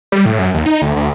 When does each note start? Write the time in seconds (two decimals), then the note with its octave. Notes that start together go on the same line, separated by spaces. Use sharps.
0.12 G3
0.25 A2
0.39 F#2
0.54 D#2
0.66 D#4
0.82 D2
0.96 D2